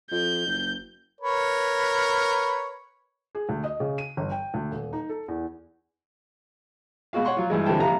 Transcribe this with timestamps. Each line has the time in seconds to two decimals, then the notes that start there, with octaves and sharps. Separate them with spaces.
0.11 F2 G6
0.47 F#1
1.21 A#4 B4 C#5
3.35 G#4
3.49 D2
3.64 D#5
3.80 C#3
3.98 D#7
4.17 G1
4.32 G5
4.54 D2
4.71 D#1
4.93 D#4
5.09 A4
5.28 E2
7.13 B2 G#3 F#4 F5
7.25 C#5 F#5 C6 C#6
7.37 F#3 F4
7.50 G2 E3 G#3
7.66 D3 E3 G3 C4 G5 A5
7.80 A#1 C3 G3 F5 A#5